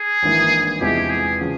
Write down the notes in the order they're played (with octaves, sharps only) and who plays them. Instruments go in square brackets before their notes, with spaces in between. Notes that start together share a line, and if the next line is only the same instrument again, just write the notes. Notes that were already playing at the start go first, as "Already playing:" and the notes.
Already playing: [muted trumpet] G#4
[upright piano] G#1 G2 E3 A#3 E4
[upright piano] E2 C3 F3 G#3 E4 [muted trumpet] G4
[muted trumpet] G#4
[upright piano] C#3 F3